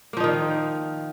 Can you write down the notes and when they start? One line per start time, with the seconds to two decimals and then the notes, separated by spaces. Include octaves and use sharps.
0.13 A#3
0.17 F3
0.20 D#4
0.24 D#3